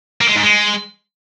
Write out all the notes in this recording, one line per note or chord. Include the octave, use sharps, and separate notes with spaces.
A#3
G#3
G#2
G#3